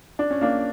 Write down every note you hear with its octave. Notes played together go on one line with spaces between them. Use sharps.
D4
C#4
A#3 D4